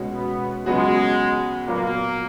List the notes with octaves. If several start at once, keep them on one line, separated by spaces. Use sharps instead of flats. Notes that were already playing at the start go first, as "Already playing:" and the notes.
Already playing: B2 G#3 C#4 F#4
B3
C#3 F#3 G#3 B3 F#4
A#2 F#3 A#3 B3